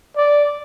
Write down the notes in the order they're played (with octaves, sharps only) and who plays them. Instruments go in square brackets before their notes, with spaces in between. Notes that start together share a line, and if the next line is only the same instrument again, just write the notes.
[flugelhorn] D5